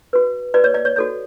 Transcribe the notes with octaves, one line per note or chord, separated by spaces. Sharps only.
F#4 B4
F#4 B4 D5
C#5
D5
C#5
F#4 A4 C#5